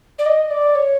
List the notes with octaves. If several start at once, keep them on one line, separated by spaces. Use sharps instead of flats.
D5
D#5
D5
C#5